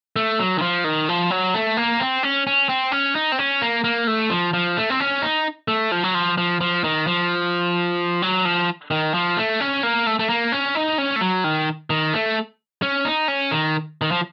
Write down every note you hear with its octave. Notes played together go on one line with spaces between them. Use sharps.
A3
F#3
D#3
F3
D#3
F3
F#3
A3
A#3
C4
C#4
C#4
C4
C#4
D#4
C4
C#4
A#3
A#3
A3
F3
F3
A3
C4
C#4
D#4
A3
F3
F#3
F3
F3
F3
D#3
F3
F#3
F3
D#3
F3
A3
C#4
A#3
A3
A3
A#3
C#4
D#4
C#4
A3
F#3
D#3
D#3
A3
C#4
D#4
C#4
D#3
D#3
F3